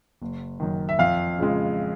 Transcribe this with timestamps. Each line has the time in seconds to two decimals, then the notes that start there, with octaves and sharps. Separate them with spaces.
0.22 F#1
0.60 F#2 D#3
0.89 E5
0.99 F2 F5
1.39 C#3 F3 G#3